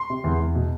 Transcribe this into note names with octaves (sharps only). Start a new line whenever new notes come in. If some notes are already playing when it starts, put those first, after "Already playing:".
Already playing: C6
C3
E2
E2
B2